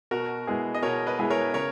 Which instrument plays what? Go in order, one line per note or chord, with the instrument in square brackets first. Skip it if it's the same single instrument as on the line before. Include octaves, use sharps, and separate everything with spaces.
[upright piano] B2 [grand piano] F#4 A#4
[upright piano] G#3 B3 E4 G#4
[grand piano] D#5
[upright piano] B2 [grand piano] A#4 C#5
[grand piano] B4 D#5
[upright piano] G#3 B3 E4 G#4
[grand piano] A#4 C#5
[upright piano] C#3 [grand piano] A#4 C#5